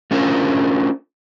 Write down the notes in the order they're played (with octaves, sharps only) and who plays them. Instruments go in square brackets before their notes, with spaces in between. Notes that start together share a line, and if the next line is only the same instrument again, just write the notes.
[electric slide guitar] A3 C#4 D4 F4 A#4 C5